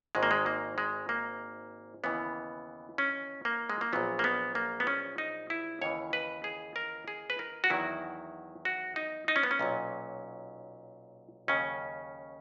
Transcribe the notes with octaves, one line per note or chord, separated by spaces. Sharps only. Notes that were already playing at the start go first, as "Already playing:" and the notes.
G#1 G#2 D#3 G#3
A#3
G#3
A#3
G#3
A#3
D#2 C#3 E3 B3
C#4
A#3
G#3
A#3
A#1 A#2 F#3 B3
A#3
B3
A#3
B3
C#4
D#4
E4
D#2 C#3 E3 C#5
B4
G#4
A#4
G#4
B4
A#4
F#4
E2 D#3 F#3 E4
F#4
D#4
D#4
C#4
B3
C#4
B1 A#2 F#3
D#2 C#3 F#3 C#4